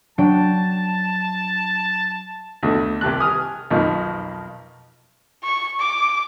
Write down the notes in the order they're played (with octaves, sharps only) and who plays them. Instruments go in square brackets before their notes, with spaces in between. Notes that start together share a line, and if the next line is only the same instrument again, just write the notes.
[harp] F#3 D4 G5 [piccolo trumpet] A5
[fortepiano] D2 B2 A3
C2 G4 A5 F#6
G#5 D#6 F6
B1 F2 D#3 F3 D#4
[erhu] C#6
D6